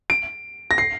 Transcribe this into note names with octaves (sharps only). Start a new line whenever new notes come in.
D7
A#6
C7